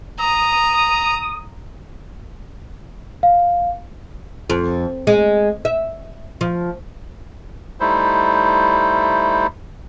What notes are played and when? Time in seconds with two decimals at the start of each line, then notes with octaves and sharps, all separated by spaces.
0.19 A#5 D#6
3.23 F5
4.50 F2
5.07 G#3
5.65 E5
6.41 F3
7.80 G3 A3 D#4 E4 C5